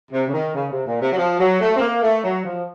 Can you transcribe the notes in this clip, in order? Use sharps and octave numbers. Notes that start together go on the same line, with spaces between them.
C3
C#3
D#3
C#3
C3
A#2
C3
F#3
F3
F#3
A3
C4
A#3
A3
F#3
F3